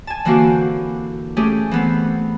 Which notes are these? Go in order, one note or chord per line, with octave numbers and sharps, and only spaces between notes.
G#5 A5
D3 E3 A#3 C4 F#4 G4
A3 C#4 G4 G#4
E3 B3 C4